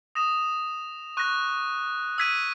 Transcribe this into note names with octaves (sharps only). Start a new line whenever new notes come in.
D#6 A#6 E7
C#6 F#6 A#6
E6 G#6 B6 D#7